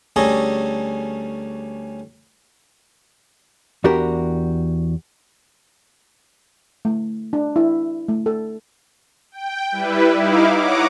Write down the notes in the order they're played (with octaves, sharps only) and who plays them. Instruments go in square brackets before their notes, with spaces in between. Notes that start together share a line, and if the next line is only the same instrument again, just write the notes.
[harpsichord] D2 G3 C#4 G#4 A4 A#5
[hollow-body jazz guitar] E2 D4 F#4 G4 A#4
[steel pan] A3
D4
E4
A3
A4
[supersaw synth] G5
G3 E4 B4
D#4 E4 F5 D6
C#5 F#5 A#5 D6 D#6